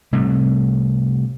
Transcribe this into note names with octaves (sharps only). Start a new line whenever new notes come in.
C3 G3 A3